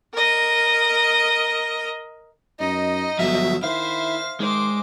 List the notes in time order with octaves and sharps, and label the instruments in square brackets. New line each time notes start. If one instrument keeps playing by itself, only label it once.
[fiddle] A#4 D#5
[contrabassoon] F#2 [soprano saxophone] D#4 [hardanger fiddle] D#5
[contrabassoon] G1 [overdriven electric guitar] F3 F#3 [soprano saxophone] E5
[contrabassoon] D#3 [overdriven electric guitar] E4 [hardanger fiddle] C5 E5 [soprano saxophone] F5
[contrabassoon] D#3 [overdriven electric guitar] G#3 [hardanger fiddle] C5 D6